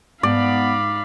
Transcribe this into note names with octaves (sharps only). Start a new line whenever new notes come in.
G#2 B3 D5 F5 B5